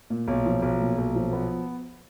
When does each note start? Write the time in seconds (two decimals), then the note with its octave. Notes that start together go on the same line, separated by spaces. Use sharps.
0.10 A#2
0.28 B1
0.46 F3
0.62 B1
0.80 A#2
0.98 B1
1.15 F3
1.33 B3